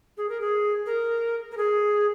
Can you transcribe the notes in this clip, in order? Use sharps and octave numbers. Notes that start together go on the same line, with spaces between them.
G#4
A#4
G#4
A#4
A#4
G#4